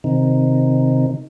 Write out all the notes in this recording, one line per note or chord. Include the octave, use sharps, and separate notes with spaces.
C3 D#3